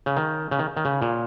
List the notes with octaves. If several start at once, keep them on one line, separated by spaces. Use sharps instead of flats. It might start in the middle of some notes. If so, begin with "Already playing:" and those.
C#3
D#3
C#3
D#3
D#3
C#3
A#2